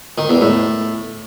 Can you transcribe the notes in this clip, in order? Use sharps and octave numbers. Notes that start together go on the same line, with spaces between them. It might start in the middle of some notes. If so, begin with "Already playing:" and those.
D#3
E2
A2